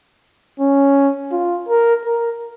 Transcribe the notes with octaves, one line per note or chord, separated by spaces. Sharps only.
C#4
F4
A#4
A#4